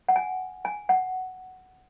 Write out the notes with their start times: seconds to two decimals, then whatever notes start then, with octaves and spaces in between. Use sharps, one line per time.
0.09 F#5
0.16 G#5
0.65 G#5
0.89 F#5